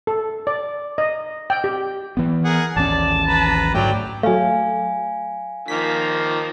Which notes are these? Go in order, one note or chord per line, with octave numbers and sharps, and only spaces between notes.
A4
D5
D#5
G5
G4
E3 B3
G#4 A#4 F#5
A1 D#2 C#4 D5 A5
B4 A#5
D2 G#2 F#3 A3 D5 G5
F#3 A3 F5 G#5
D#3 F3 A#3 B6